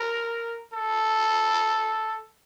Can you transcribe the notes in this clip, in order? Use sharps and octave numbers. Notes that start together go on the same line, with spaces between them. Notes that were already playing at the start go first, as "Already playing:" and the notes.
Already playing: A#4
A4